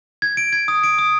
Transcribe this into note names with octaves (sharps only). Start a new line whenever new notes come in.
G#6
D7
G#6
D#6
D7
D#6